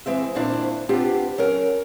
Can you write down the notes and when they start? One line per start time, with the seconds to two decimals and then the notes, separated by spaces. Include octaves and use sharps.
0.06 E3 G#3 C4 E5
0.35 F2 A#2 D#3 C4 D4 E4
0.89 B3 C4 D4 F4 G4
1.38 F#3 C#4 A#4